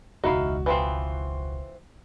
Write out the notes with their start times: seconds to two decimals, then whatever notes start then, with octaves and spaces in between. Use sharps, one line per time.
0.24 E1 C#2 D#4 E4 F#4 F5
0.66 E3 F3 C4